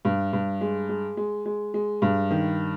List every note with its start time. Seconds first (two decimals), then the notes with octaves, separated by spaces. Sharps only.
0.05 G2
0.33 G2
0.61 G#3
0.89 G#3
1.17 G#3
1.46 G#3
1.74 G#3
2.02 G2
2.31 D#3